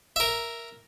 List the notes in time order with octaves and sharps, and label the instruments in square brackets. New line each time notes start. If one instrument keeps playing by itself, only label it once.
[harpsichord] A#4 E5